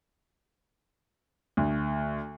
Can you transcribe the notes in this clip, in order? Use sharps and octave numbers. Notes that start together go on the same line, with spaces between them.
D2